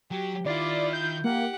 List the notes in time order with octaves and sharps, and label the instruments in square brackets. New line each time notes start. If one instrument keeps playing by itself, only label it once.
[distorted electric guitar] F#3 [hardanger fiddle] G4
[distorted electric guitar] D#3 [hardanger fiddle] E4 F4 [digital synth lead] D5
[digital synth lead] G6
[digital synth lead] A#3 [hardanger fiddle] G4 F#5